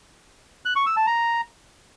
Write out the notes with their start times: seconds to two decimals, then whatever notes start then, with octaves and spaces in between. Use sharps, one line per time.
0.65 F#6
0.76 C#6
0.86 E6
0.97 A5
1.07 A#5